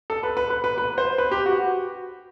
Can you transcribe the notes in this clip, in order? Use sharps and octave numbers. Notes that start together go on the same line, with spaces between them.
A4
B4
B4
B4
B4
B4
C5
B4
G4
F#4